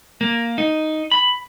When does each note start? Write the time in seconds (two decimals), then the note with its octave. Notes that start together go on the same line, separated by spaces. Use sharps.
0.21 A#3
0.58 D#4
1.11 B5